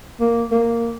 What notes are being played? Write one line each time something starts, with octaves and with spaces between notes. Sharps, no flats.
A#3
A#3